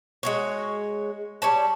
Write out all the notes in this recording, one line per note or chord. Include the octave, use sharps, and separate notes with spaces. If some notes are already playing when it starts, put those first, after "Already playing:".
G#3 F#4 C#5
G3 C#5 A5